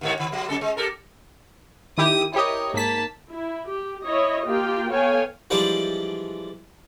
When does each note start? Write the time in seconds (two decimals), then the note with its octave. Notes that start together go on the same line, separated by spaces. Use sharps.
0.01 D#2 G#2 C#5
0.20 D#3
0.32 F#3 G3
0.49 F#3 C#4 A4
0.61 G#3
0.77 G4 A4 A#4
1.98 D#3 E4 G4 D#6
2.34 E4 G4 A#4 C#5 D#5
2.74 G#2 A#3 A5 B6
3.29 E4
3.67 G4
4.06 E4 C#5 D#5
4.45 A#3 F4 G4 F5 G5
4.91 B3 A4 C#5 F5 G5 G#5
5.50 E3 F3 G3 G#3 D4